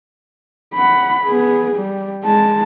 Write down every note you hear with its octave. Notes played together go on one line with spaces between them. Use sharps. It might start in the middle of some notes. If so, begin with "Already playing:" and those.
F#5 B5
B3 G#4
G3
G#3 A5